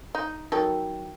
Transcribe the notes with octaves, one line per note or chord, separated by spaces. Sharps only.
D#4
D#3 F#3 A4